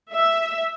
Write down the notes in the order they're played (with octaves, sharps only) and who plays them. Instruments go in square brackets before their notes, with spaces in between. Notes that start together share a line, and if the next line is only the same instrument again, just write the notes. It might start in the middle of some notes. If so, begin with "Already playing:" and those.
[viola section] E5